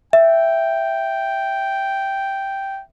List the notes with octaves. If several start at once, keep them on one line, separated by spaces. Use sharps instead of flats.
E5 G5